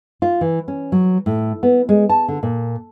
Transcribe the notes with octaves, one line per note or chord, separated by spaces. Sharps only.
F4
E3
C#4
F#3
A2
B3
G#3
A5
D3
A#2